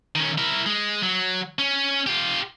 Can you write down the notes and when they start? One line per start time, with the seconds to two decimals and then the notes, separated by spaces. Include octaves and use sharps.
0.15 D#3 C#4
0.38 E4 A#4
0.66 G#3
1.03 F#3
1.59 C#4
2.07 F4 G4